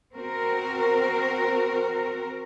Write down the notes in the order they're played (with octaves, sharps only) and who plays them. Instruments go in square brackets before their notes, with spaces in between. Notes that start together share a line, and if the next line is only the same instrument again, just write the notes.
[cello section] C4 F#4 A#4